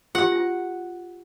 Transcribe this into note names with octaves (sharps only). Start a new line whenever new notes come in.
F4 G4 F#5
F4